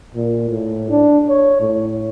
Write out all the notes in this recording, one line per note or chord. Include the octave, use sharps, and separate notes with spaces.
A#2
A2
D4
C#5
A2